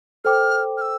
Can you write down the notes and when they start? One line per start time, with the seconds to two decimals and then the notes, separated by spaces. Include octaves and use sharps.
0.25 A4 C5 G5 D6 F6
0.77 F6
0.81 E6